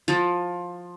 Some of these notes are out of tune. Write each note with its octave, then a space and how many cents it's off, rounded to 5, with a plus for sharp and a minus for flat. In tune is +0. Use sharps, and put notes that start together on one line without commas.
F3 +15